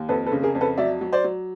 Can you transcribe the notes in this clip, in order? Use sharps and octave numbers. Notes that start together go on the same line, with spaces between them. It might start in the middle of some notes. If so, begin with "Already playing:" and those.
Already playing: D#2
F2 A4 B4
A4 B4
C#3
G#4 A#4
F2
A4 B4
F#3 D5 E5
F#3
C5 D5
F#3